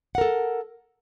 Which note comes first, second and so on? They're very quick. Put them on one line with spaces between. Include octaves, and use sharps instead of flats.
F#5 A#4 A4